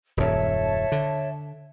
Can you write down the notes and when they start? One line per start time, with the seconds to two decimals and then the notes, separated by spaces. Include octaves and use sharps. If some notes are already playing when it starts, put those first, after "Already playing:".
0.17 D#1 F#2 C#5 E5 A5
0.92 D3